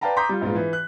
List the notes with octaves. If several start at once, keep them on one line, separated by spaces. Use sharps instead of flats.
B4 D5 F5 G5 A5 A#5
A#5 C6 D6 D#6 G6 B6
G3 F4
A#1 G#2 B3 F4
E3
F#6